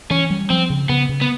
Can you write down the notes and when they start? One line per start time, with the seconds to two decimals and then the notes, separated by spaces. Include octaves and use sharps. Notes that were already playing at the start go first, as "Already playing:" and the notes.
0.11 E3 C#4
0.30 G3
0.50 F3 C4
0.70 C#3
0.89 C#3 B3
1.09 C#3
1.21 B3